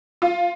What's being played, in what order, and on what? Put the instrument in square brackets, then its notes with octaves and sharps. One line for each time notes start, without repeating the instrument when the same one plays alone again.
[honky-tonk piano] F4